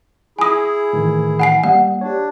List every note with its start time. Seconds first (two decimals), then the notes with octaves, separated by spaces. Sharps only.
0.39 E4 G#4 G#5 D#6
0.93 A2 D#3 E3
1.40 F#5 G#5 C7
1.64 G3 A#3 F#5
2.01 D4 G4 C#5